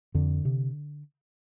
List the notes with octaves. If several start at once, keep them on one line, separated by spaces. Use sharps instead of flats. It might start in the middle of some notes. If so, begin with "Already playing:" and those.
F2 D3
C3